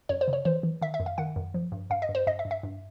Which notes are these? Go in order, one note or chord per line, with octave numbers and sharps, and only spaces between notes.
F#2 C#5
C5
C#3
C#5
E3 C5
E3
D#3 E5
E5
F#2
F5
D#3 F#5
F#2
F3
G2
G2 F5
D#5
G2
C5
G2 D#5
E5
G2
E5
G2